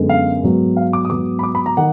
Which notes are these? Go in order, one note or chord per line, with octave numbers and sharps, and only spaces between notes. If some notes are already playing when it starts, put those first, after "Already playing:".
Already playing: F#2 D3 G#3 B3
F5
G#2 F#3 B3
F5
D6
D#6
G#2 F#3 B3 D6
B5
D6
B5
A#5
D#3 F#5